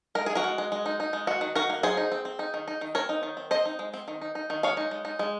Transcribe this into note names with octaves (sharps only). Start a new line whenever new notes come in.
G#3 A#4
G#3 G#4
F#4 A#4
G#3
G#3
G#3
D#4
D#4
G#3
D#3 F#4
D#3
D#3 F#4 A#4
A#3
F#3 G#4 C5
D#4
C4
C4
D#4
D#3
D#4
D#3
C4 A#4 C#5
D#4
D#3
C4
C4 C5 D#5
D#4
G#3
C4
D#3
D#4
D#4
D#3
G#3 C#5 F5
D#4
G#3
D#4
G#3